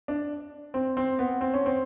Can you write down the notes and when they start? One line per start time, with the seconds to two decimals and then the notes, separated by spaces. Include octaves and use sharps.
0.08 D4
0.74 C4
0.97 C4
1.19 B3
1.41 C4
1.54 C#4
1.66 C4